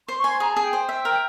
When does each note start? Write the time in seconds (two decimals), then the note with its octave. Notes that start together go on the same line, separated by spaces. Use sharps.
0.08 C5 C6
0.18 C#6
0.24 G#5 C6
0.40 G#4 A#5
0.51 A5
0.56 G#4
0.62 G5
0.73 C5
0.89 E5
1.05 A#4